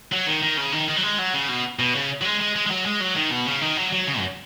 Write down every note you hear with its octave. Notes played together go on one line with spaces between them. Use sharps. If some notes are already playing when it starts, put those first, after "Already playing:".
F#3
D#3
D#3
C#3
D#3
D#3
F#3
G#3
F#3
C#3
B2
B2
C#3
F#3
G#3
G#3
G#3
G#3
F#3
G#3
F#3
D#3
B2
C#3
D#3
F#3
F#3
C#3
F#2